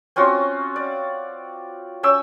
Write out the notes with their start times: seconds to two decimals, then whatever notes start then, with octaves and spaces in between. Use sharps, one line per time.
0.16 C4 C#4 F4 F#4
0.76 D5
2.03 C#4 G5 E6